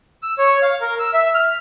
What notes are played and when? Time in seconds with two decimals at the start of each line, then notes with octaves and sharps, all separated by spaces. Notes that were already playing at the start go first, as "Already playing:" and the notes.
0.23 E6
0.39 C#5
0.62 F5
0.81 A#4
0.99 E6
1.14 E5
1.35 F6